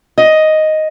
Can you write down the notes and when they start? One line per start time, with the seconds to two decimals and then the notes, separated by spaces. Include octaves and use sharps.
0.18 D#5